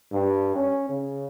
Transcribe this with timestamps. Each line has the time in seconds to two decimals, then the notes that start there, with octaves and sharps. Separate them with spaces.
0.12 G2
0.56 C#4
0.89 C#3